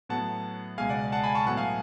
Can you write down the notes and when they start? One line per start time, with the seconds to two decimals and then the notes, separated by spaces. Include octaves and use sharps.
0.09 A2 F#3 B3 F#5 A5
0.78 C#2 B2 G#3 F5 G#5
0.89 D5 F#5
1.12 F#5 A5
1.23 G#5 B5
1.35 A5 C#6
1.46 A2 F#3 B3 F#5 A5
1.57 F5 G#5